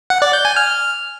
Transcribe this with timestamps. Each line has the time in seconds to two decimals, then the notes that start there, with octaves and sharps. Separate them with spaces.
0.10 F#5
0.22 D5
0.33 G6
0.45 G#5
0.56 F6